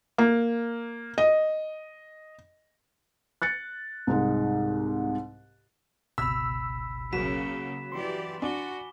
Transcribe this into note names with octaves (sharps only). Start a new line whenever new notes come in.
A#3
D#5
F#6 A6 C#7
C2 G#2 G#3 D#4
G1 C#2 B2 B5 E6 B6
C#3 F#3 A#3 B6 E7
E3 G4 D5 C6
D4 F#4 G#5 D6 G7